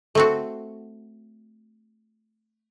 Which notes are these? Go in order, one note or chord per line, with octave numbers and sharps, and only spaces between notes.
A3 C4 F#4